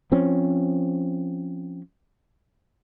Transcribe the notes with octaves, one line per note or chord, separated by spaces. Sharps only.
F3 C4 C#4